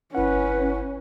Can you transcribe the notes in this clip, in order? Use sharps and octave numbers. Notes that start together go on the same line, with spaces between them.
G1 C#4 E4 B4 F#5